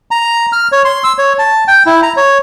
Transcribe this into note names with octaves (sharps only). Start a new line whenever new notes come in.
A#5
F6
C#5
C6
E6
C#5
A5
G5
E4
A#5
C#5